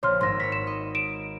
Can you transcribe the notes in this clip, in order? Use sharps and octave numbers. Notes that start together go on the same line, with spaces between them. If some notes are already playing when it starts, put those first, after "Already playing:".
A#1 C#5 C6 F6
G#1 C6 E6 A#6
C#5 B5 B6
E7
D#5
D7 E7